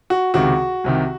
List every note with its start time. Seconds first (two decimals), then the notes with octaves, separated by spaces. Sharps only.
0.10 F#4
0.34 C#2 C3 D#3 F#4
0.84 C2 C3 D#3